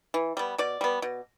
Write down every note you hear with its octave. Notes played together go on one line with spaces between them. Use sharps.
E3
G3 B3
B2 D5
G3 B3
B2